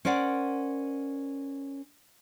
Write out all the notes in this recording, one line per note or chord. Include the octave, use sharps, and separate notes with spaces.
C#4 A#4 C5 D5 F#5